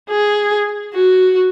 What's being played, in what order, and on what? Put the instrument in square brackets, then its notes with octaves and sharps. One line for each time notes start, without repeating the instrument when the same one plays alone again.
[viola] G#4
F#4